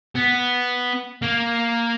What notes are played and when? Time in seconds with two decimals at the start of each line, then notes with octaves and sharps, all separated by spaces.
0.15 B3
1.22 A#3